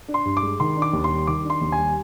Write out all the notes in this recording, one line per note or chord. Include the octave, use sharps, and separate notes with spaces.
D4
C6
G2
D6
G#3
D#3 C6
D4
D6
D#2
C6
G3
D#3 D6
D4
C6
D#2
G#5
G3